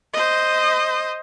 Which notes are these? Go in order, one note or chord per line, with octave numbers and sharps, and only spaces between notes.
C5 D#5